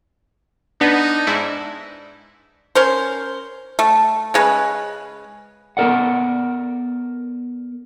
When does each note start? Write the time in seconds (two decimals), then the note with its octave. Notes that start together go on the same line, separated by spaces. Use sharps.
0.81 B3 D4 D#4
1.27 G#2 E4
2.75 C#4 A#4 C5
3.79 A3
4.34 C#3 G#3 C#4 B4
5.77 B3 A4 A#4 D5 F#5